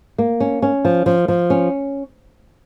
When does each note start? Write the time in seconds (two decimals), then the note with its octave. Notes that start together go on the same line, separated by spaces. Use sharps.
0.18 A#3
0.40 C#4
0.62 C#4
0.85 F3
1.06 F3
1.28 F3
1.50 C#4